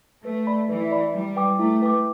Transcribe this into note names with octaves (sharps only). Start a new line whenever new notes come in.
A3 B4
D5 B5
E3 B4
D5 B5
G3 E4
B4 G5 D6
A3 E4
B4 G5 D6